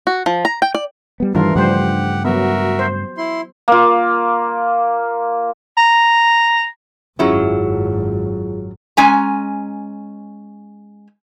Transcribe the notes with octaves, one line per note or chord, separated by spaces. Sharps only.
F#4
F3
A#5
G5
D5
G3 B3
G2 D#3 E3 G3 A3 D4 F4 A#4
G2 C#3 F3 G3 A3 G4 C5 F#5
F#3 B3 F#4 A#4 E5
C5
E4 C6
A#3 F4
A#5
G#1 F#2 F#3 C#4 E4 F4 G#4
G#3 C#4 G#5 A#5